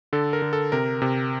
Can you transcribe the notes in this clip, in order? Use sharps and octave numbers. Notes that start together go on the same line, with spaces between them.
D3 A4
A#4
D3
A4
C3 A#4
C3